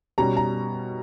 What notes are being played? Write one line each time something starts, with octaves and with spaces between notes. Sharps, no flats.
B2 G3 C#4 A#5
A#5